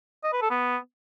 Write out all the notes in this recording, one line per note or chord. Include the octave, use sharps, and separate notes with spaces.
D#5
B4
A4
B3